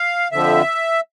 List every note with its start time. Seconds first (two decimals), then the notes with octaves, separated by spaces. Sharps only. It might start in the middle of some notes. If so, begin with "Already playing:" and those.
Already playing: F5
0.32 F2 D3 F3 E5